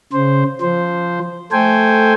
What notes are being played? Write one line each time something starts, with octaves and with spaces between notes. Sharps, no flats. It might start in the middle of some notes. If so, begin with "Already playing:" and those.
C#3 C5
F3 C5
A3 A4 C5 G5 G#5